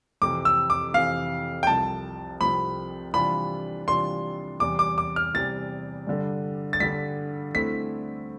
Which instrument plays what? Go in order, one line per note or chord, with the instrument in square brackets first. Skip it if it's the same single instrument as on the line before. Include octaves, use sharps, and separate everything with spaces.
[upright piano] F2 C3 E3 [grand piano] D6
[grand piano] E6
D6
[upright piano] F2 C3 E3 [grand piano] F5
[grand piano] G5
[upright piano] C2 C3 F3 [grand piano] A5
[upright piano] C2 C3 F3 [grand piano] B5
[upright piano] C3 E3 G3 D4 F4 [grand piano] B5
[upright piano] C3 E3 G3 D4 F4 [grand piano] C6
[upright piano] E2 C3 E3 G3 [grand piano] D6
[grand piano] D6
D6
F6
[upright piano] E2 C3 E3 G3 [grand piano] A6
[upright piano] G2 D3 G3
[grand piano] A6
[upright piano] G2 D3 G3 [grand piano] B6
[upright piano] D2 D3 A3 C4 E4 [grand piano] B6